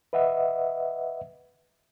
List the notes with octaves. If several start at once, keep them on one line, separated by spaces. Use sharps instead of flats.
B4 D#5 E5 F#5